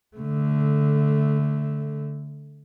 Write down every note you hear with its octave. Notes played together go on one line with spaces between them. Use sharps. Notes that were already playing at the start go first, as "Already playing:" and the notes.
D3 A3